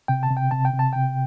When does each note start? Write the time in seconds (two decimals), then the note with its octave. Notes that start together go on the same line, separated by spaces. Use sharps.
0.08 C3 G5
0.23 A5
0.30 C3
0.37 G5
0.51 C3 A5
0.65 G5
0.73 C3
0.79 A5
0.93 C3 G5